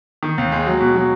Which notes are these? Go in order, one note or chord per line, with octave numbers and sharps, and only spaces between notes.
D#3
D#2
G#3
F#3
B2
F#3